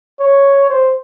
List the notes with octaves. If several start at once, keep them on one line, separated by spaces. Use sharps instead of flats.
C#5
C5